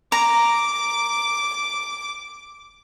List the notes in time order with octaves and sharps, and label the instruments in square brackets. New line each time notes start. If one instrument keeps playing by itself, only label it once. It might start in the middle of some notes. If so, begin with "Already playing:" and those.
[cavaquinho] A#5 [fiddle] D6